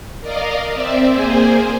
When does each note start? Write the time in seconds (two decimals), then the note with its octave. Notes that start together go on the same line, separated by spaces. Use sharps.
0.21 A#4 D5 D#5 F5
0.72 C4 D5 E5
1.11 A#3 G#4 C5 G#5